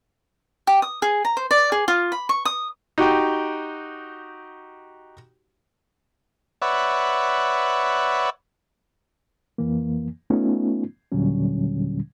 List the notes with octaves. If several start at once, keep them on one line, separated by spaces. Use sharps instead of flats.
G4
D#6
G#4
A#5
C5
D5
G#4
F4
B5
C#6
D#6
D#4 F#4 G4 G5
B4 C#5 D5 E5 F#5
F2 E3 A#3
A3 B3 C#4 D#4 F4
D#2 A#2 D3 F#3 G3 C#4